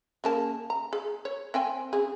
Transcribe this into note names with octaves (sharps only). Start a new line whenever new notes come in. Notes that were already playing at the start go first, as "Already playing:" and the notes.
C#3 A#3 A5
A#5
G#4
C#5
C4 G5 G#5
C#3 G#4